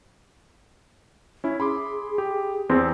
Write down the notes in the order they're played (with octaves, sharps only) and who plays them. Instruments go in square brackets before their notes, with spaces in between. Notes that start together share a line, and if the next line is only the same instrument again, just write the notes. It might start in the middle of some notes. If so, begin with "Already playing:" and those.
[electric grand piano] C#4 E4
[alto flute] G#4 [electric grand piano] B5 C6 D6
[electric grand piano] G4
[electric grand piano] E2 [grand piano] C4